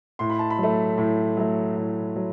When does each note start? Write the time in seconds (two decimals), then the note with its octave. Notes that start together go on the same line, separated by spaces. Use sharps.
0.19 A2 C6
0.30 B5
0.39 A5
0.50 B5
0.58 F#3 A3
0.98 A2
1.37 F#3 A3
1.77 A2
2.16 F#3